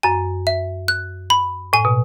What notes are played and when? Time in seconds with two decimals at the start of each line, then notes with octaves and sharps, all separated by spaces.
0.03 F#2 G#5
0.47 E5
0.88 F#6
1.30 B5
1.73 A2 G#5
1.85 B2